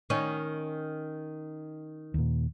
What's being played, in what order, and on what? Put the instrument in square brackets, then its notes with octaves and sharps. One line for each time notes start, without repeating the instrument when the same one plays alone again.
[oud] D#3 C#4
[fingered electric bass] D#2 A#2